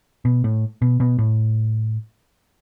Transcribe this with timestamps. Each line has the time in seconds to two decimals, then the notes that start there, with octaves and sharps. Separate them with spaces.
0.25 B2
0.44 A2
0.82 B2
1.00 B2
1.19 A2